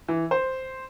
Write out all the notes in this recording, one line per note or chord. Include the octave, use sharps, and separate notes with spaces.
E3
C5